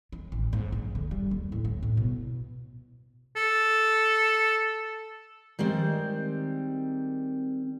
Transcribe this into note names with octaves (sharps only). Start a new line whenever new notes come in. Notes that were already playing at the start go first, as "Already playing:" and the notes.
D#3
A1
G#2
A#1
D3
G3
D#2
A2
D2
A2
B2
A4
D#3 G3 G#3 C4